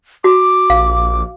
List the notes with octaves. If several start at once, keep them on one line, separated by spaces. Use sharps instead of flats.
F#4 D6
A#1 F5